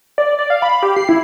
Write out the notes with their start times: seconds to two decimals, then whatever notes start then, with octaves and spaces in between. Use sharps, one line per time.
0.18 D5
0.39 D5
0.50 F5
0.62 B5
0.83 G4
0.96 C7
1.09 E4